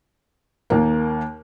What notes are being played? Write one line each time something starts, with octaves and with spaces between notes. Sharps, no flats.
D#2 A#3